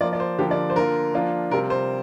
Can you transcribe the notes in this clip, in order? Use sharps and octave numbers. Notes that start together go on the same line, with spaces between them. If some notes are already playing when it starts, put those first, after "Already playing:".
F3 A#3 F4 D5
D5
C5
D3 F3 A#3 F4 G4
D5
C5
D3 A#3 F4 A#4
F3 A#3 D4 F4
C3 G3 C4 F4 A#4
C5